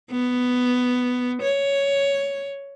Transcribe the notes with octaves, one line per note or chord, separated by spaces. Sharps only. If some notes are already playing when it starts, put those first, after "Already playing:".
B3
C#5